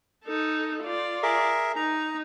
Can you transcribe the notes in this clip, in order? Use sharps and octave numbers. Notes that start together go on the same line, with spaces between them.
D#4 A4
F4 D5
G#4 A#4 E5
D#4 A#5